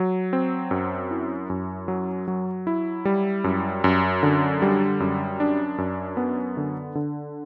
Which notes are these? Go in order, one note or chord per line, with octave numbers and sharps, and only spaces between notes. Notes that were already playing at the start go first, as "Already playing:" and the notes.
Already playing: F#3
C4
F#2
E4
F#2
F#3
F#3
E4
G3
F#2
F#2
D3
G3
F#2
D4
F#2
B3
D3
D3